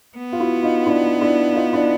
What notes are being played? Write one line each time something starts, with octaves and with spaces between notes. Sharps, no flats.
B3
F4
E4 F#4
D#4 F4
D4 E4
D4 E4
D#4 F4
D4 E4